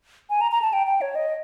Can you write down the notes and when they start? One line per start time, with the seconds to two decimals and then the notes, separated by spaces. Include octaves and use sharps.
0.30 G#5
0.41 A#5
0.51 A#5
0.62 A5
0.73 G5
0.87 G5
1.01 C#5
1.15 D#5